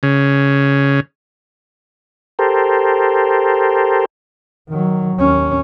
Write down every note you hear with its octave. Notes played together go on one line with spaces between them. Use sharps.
C#3
G4 A4 A#4 C5
D#3 F#3
D#2 C#4